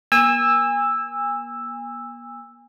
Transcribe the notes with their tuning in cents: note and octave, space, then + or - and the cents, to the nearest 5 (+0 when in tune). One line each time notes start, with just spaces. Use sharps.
A#3 +40 G#5 -30 E6 +0